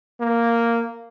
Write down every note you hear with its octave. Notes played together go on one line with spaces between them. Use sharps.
A#3